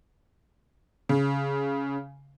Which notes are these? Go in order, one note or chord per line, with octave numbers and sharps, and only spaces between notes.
C#3